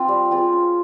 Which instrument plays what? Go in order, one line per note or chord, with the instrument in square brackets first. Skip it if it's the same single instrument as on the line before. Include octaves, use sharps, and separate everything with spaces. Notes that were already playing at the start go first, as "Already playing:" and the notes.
Already playing: [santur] C4 F4
G3
C4 F4 G#4
C#4